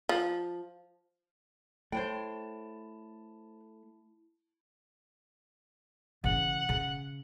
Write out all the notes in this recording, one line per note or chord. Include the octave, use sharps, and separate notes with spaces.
F3
A3 E4 C5 C#5 G5 A5
C#3 E3 F#5
C#3